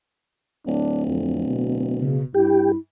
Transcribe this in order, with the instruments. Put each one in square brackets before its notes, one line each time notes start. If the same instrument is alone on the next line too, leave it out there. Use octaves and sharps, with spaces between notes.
[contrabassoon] D1 [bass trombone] D4
[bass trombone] F2
B2
[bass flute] C#3
[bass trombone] G2 [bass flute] E4 [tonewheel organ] G4